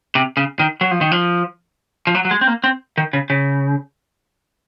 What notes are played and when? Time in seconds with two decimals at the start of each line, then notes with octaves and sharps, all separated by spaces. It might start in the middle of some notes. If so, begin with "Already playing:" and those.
0.15 C3
0.37 C#3
0.59 D#3
0.81 F#3
0.91 F3
1.01 D#3
1.11 F3
2.07 F3
2.15 F#3
2.25 F#3
2.31 G#3
2.41 C4
2.47 A#3
2.64 C4
2.97 D#3
3.13 C#3
3.30 C#3